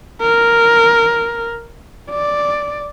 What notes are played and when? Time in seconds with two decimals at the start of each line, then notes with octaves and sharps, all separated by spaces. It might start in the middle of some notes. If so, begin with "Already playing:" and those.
0.21 A#4
2.10 D5